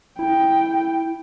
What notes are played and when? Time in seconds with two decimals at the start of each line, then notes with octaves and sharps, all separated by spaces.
0.19 E4 G5